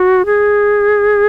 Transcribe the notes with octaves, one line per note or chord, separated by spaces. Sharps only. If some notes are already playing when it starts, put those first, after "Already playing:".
Already playing: F#4
G#4